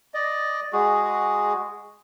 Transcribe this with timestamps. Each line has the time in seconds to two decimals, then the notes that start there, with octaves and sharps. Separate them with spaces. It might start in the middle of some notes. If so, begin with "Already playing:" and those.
0.14 D5 D#5
0.73 G#3 F#4 G#4